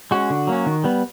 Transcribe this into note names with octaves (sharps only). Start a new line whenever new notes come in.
G#3 C#4 F#4
D3
F#3 A#3 C#4
D#3
G3 B3